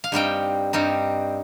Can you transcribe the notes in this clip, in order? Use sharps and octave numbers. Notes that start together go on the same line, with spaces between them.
F5
G2 G3 C4 D#4 G5
G2 G3 C4 D#4